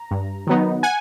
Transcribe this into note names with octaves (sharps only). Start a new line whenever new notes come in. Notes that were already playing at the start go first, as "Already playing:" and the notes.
Already playing: A#5
G2
D#3 F#3 B3 D#4
F#5 G#5